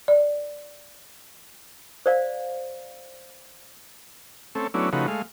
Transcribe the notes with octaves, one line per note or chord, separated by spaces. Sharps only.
D5
C5 D5 F5
A3 C4 C#4 A4
F#3 A3 B3 C#4 D4 E4
C#3 F3 A3 D#4 F#4 B4
G#3 A3 F5